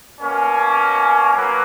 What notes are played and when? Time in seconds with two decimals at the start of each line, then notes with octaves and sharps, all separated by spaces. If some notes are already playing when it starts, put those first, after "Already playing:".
0.20 B2 A#3 C#4
1.34 F#3 A#3 B4